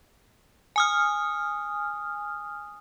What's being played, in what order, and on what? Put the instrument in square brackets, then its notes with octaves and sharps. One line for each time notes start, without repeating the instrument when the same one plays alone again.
[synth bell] G#5 D#6 F6